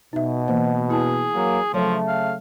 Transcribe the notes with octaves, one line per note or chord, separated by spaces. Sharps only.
B2 D#4 E5
E3 A#3 C5
E4 G#4 A5
F#3 A#3
C#3 F3 F#3 A3 C#5
F5